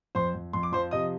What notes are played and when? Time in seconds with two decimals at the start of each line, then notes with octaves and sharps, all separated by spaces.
0.15 F2 C5 C6
0.35 F2
0.53 F2 C6
0.63 D6
0.72 F3 C5 C6
0.91 C3 D#5 D#6